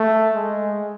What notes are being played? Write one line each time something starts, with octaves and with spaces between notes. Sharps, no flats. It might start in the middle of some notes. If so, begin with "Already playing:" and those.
Already playing: A3
G#3